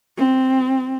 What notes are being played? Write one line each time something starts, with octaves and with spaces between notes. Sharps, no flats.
C4